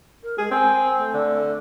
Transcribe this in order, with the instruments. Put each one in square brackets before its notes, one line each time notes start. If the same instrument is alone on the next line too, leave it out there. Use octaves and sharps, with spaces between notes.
[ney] A#4
[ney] G#3 [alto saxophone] G#4
[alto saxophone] C4 [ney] G#5
[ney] A3
[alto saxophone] D3